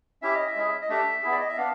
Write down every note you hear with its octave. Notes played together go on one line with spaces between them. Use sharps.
C#4 E4 G4 E5
D#5
E5
G#3 C#4 E4 G#4
D#5
A3 D4 G4 E5
B3 E4 G#4
D5
D#5
E5
B3 D4 F5